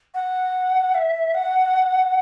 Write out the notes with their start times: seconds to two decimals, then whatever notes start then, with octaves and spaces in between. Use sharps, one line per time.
0.14 F#5
0.94 E5
1.34 F#5